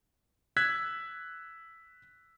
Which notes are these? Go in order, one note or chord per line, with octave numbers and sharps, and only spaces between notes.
E6 F#6 G#6 B6